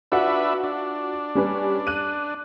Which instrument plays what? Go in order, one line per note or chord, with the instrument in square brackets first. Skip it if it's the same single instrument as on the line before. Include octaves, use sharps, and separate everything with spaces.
[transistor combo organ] D4 B4 E5 [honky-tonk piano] F4 F#4 F#5
[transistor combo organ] D4
[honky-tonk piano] G3 C#4 B4
F#6 D#7